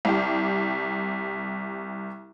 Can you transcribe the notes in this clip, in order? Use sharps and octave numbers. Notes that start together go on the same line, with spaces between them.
C2 G4